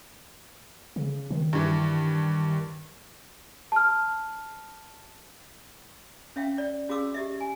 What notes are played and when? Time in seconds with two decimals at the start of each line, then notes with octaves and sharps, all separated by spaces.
0.96 C#3
1.31 D#3
1.53 G2 E3
3.72 A5 F6
6.36 C#4 E5 F5 G5
6.58 D5
6.89 C#4 F#4 G#4 F5 D6 E6
7.14 G4 D#5 E5
7.41 G#5